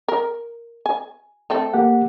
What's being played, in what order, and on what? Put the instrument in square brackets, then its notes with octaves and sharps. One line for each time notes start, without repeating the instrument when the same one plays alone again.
[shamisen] A#4
G#5
A3 C4 A4
[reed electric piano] A#3 G4 F#5